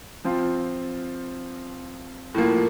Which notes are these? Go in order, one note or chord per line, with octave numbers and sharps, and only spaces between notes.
F3 C4 F4
A2 F3 A#3